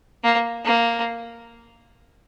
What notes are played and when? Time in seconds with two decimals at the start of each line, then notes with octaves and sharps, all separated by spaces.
0.24 A#3
0.64 A#3